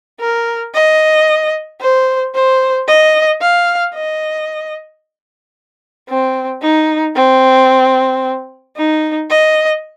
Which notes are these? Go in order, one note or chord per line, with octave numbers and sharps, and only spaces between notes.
A#4
D#5
C5
C5
D#5
F5
D#5
C4
D#4
C4
D#4
D#5